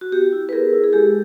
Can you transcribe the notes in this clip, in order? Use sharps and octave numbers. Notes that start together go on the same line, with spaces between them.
F#4
B3 G4
E4
B4
B3 G#4 A#4
E4
G#4
G#3 G4 A4